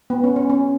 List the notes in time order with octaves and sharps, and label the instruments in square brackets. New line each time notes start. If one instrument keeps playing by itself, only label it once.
[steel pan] B3
C#4
C#4
C#4